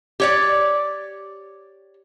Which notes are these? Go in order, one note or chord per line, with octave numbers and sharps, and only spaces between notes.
G4 C#5 D5